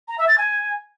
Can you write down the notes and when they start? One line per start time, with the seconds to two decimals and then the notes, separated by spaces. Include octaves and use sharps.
0.08 A#5
0.18 E5
0.28 A6
0.38 G#5